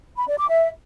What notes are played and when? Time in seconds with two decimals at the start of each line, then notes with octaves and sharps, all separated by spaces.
0.17 B5
0.27 D5
0.38 D6
0.49 E5